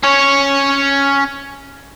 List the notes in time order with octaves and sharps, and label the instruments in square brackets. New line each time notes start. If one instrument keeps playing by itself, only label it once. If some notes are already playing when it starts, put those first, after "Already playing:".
[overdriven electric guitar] C#4 C#5